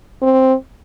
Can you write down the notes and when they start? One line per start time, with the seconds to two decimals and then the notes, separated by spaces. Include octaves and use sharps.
0.22 C4